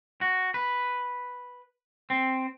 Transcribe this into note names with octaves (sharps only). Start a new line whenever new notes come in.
F#4
B4
C4